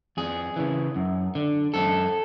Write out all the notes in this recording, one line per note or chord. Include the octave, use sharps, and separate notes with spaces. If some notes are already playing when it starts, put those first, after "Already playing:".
F2 G#4
C#3 E3
F#2
D3
F#2 A4